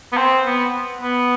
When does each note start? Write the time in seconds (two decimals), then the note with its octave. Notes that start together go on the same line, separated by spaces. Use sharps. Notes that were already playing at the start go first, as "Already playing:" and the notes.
0.13 B3
0.17 C4
0.46 B3
1.01 B3